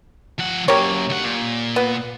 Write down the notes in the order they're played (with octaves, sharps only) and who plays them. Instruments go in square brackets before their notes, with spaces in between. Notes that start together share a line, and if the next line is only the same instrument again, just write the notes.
[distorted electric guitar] F3 F#5
[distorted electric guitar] F#2 A#3 [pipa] G4 A#4 C#5
[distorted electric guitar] D2 F#5
A#2
[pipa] B3